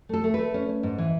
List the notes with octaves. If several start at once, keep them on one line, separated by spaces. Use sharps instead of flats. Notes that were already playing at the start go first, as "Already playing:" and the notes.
A3 A4
A3
A3 B4
C#4
C#4
G#2
E3